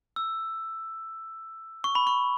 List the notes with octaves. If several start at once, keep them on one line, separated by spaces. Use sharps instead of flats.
E6
C#6
B5
C#6